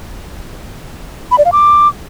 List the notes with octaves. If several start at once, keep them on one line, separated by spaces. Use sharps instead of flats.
B5
D5
F5
D6